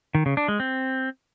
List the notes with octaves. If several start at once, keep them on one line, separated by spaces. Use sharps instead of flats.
D#3
C#3
D4
G#3
C4